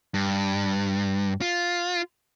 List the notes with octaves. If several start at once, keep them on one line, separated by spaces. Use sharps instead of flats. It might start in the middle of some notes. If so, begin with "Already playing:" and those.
G2
F4